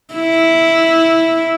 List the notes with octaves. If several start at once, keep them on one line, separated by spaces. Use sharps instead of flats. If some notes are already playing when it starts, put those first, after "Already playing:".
E4